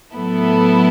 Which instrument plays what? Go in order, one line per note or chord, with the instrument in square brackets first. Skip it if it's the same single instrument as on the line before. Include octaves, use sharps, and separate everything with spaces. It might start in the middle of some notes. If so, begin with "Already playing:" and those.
[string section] A2 F#3 B3 E4 A4